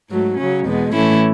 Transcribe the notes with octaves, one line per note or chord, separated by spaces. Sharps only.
G#2 F#3 A3
C#3 F#3 C#4
E2 B2 G#3 B3
A2 E3 A3 C#4 E4